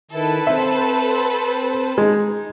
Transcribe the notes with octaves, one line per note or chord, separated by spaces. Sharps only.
D#3 E4 A4 B4
C4 C5 E5
G#3 D#4